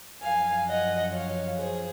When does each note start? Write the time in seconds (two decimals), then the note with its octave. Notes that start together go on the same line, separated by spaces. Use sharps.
0.22 F#2 F3 F5 G#5
0.67 D#5 F#5
1.12 C#5 F5
1.57 G#4 C5